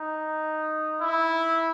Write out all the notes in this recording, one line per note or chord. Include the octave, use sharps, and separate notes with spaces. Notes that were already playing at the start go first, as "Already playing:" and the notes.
Already playing: D#4
E4